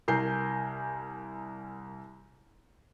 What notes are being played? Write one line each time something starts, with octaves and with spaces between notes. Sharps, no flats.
C2 A#4 G#5 G6 C7